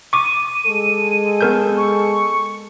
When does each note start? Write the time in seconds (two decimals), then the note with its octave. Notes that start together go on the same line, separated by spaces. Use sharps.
0.13 C#6 D6 D#7
0.66 G#3 A4
1.41 B3 A#4 G6
1.77 C#6